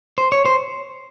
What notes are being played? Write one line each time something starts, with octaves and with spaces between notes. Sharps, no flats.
C5
C#5
C5